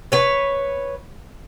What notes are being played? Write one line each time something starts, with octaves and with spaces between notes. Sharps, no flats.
B4 C#5